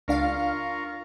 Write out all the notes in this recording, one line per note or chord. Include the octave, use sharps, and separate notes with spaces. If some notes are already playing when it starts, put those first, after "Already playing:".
C#2 D4 F4 A#4 F5 C#6